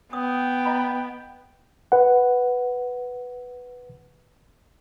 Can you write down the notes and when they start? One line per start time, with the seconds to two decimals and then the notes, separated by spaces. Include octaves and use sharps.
0.13 B3 G5 D#6
0.65 D#5 A#5 B5
1.92 B4 F#5